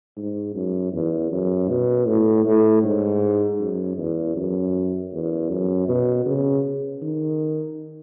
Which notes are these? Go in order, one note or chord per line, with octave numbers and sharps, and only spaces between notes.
G#2
F#2
E2
F#2
B2
A2
A2
G#2
F#2
E2
F#2
E2
F#2
B2
C#3
D#3